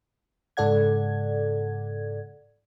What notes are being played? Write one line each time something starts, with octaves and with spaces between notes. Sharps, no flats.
G#2 C#3 A4 D5 F#5 G#6